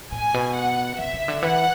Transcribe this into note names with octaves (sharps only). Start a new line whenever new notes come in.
A2 G#5
B2
F#5
C#3 E5
C#3
D3
E3 F#5